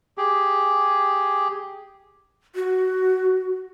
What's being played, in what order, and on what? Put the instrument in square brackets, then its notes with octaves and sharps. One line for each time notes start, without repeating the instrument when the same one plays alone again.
[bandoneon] G4 G#4
[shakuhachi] F#4